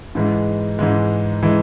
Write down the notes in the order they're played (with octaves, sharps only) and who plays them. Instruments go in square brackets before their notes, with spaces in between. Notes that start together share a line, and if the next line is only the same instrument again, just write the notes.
[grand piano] G#2 E3 G#3
G#2 E3 G#3
E3 G#3